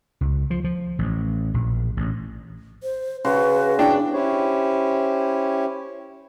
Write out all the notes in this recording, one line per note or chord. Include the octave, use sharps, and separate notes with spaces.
C#2
F3
F3
A1
A#1
A1
C5
C#3 F#4 B4 C6
D4 E4 G5
C#4 E4 G4 C5 C#5